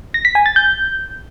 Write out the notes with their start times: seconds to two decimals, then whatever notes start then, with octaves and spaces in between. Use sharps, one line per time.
0.14 A#6
0.25 B6
0.35 G#5
0.46 A6
0.56 G6